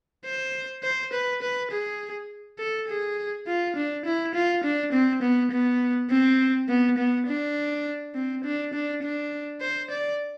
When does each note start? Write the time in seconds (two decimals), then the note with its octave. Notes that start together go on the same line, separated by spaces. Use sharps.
0.25 C5
0.83 C5
1.13 B4
1.42 B4
1.71 G#4
2.59 A4
2.88 G#4
3.47 F4
3.76 D4
4.05 E4
4.34 F4
4.64 D4
4.92 C4
5.22 B3
5.51 B3
6.10 C4
6.69 B3
6.98 B3
7.27 D4
8.15 C4
8.44 D4
8.73 D4
9.03 D4
9.61 C5
9.90 D5